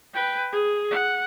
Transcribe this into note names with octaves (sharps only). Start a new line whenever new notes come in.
B4 G5
G#4
F#5